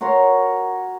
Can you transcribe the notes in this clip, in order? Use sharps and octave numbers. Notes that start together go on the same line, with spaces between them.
F#4 A#4 C#5 C6